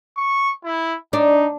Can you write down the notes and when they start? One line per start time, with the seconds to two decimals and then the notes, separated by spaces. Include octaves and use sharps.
0.17 C#6
0.64 E4
1.13 D4 D#4